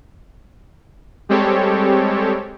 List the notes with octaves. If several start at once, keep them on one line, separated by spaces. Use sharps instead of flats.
G3 G#3 C4 G4 A4 C#5